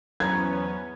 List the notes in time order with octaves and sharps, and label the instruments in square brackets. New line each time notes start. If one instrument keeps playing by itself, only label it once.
[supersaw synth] E2 B3 C#4 [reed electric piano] F#3 C5 A#5 [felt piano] G#6